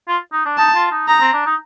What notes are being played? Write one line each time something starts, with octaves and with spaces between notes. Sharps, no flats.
F4
D#4
D4
D#4 A5
F4
D#4
D#4 A#5
C4
D4
D#4